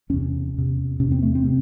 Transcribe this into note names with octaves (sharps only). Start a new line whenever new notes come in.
E2 C3 C#4
E2 C3
E2 C3 C#4
C4
A3
C4
C3